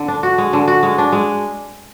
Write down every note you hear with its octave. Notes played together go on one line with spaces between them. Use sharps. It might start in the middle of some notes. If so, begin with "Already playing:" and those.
Already playing: D3
D4
F#4
G#3
D3
F#4
G#3
D4
G#3